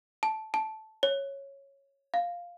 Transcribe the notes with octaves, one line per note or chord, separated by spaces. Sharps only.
A5
A5
C#5
F5